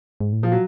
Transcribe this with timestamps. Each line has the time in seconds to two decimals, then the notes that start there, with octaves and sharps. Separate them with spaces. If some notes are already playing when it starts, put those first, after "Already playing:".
0.20 G#2
0.33 A2
0.42 A#2 F3
0.52 F#3